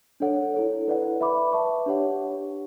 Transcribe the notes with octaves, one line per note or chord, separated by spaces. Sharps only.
D4 A4 C#5 F#5
E4 A4 C#5
E4 B4 D5 F#5
B4 E5 B5 D6
B4 E5 A5 C#6
D4 G4 C#5 F#5